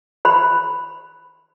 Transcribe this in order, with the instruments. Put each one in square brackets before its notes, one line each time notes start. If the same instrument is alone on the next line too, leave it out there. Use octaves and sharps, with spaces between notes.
[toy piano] C5 B5